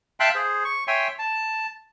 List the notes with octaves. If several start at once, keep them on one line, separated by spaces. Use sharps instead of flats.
E5 F5 G5 A5 C6 F#6
G#4 C5
C#6
C#5 E5 G5 G#5 C6
A5